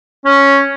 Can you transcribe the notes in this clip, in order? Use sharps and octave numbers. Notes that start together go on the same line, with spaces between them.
C#4